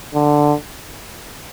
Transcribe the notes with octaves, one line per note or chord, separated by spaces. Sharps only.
D3